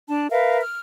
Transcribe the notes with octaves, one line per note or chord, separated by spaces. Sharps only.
D4 A5
A#4 B4 E5 F5
F6